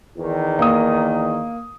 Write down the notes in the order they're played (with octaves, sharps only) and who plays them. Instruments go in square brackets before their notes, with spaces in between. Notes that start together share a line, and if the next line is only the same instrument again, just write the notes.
[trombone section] E2 D#3
[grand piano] A#3 D#6